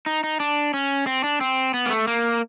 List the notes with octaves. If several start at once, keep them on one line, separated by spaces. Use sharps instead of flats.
D#4
D#4
D4
C#4
C4
D4
C4
B3
A#3
A3
A#3